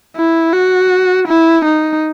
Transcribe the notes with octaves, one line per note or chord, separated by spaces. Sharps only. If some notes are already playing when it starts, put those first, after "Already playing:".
E4
F#4
E4
D#4